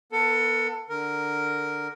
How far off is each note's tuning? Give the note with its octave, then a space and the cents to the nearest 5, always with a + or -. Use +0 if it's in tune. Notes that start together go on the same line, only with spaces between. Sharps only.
B3 -25 A4 +25
D3 +0 A#4 -5